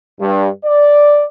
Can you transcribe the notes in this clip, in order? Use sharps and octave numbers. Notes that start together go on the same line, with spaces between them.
G2
D5